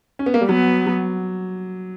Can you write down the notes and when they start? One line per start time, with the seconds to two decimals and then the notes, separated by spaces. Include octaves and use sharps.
0.19 C#4
0.26 B3
0.34 A#3
0.41 G3
0.49 F#3 B3
0.87 F#3